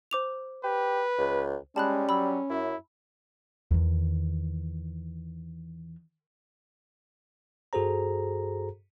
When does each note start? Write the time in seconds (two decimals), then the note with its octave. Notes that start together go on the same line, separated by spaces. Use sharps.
0.11 C5 D6 F7
0.64 G4 B4
1.18 C#2
1.76 G3 G#3 C#4 A5 B5 F#6
2.09 F#3 B5 E6
2.50 F#2 E4
3.71 E2 D#3
7.73 G2 F#4 G#4 A4 C5 A#5